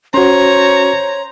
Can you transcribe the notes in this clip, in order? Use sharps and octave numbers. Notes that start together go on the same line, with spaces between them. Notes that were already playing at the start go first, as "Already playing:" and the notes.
C#4 F#4 C5 C#5 A#5